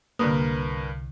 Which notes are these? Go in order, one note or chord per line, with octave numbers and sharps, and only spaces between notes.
C2 G2 D3 A#3 A#4 B4 D#6